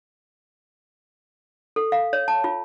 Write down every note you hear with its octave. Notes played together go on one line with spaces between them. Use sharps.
A4
F5
C#5
A5
F4